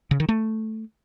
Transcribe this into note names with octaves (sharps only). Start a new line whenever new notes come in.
C#3
D#3
A3